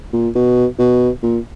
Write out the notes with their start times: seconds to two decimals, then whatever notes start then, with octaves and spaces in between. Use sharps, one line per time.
0.13 A#2
0.35 B2
0.79 B2
1.23 A#2